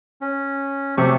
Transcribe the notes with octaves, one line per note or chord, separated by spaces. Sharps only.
C#4
C3 F#3 A3 G4 C#6